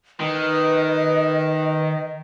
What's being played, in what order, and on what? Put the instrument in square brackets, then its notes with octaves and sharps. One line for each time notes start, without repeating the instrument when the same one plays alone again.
[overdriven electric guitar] D#3 [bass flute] B4 [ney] D#5